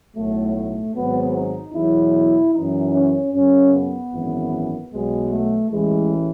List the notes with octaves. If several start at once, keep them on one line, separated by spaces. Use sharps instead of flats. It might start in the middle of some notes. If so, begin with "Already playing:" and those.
B1 A2 F#3 A3
A3
G#1 G#2 F#3 B3
D#4
E2 B2 F#3 E4
F#2 E3 D#4
C#4
F#2 C#3 F#3 C#4
B3
G#1 F#2 E3
B1 B2 F#3 G#3
A3
A1 A2 E3 G#3